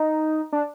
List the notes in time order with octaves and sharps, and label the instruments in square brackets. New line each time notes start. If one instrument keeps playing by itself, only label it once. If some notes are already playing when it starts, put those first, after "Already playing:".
Already playing: [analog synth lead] D#4
D4